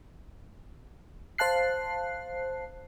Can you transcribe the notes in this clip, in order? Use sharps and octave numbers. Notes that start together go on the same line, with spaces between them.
C5 F5 A5 F#6 C7